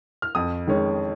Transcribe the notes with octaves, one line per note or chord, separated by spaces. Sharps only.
F6
F2 D#6
D#3 G#3 C#4